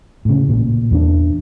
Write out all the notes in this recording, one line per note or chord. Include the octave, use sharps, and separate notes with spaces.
A2 C#3
A1 A#2
E2 A#3 D4